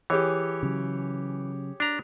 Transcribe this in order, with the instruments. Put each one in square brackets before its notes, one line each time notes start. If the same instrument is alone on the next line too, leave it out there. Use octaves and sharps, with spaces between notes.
[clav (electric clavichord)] E3 [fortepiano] G4 G#4 C#5
[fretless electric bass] C#3 F#3
[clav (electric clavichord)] D4 A#5